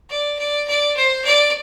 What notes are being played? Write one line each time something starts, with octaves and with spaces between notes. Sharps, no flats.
D5
D5
D5
C5
D5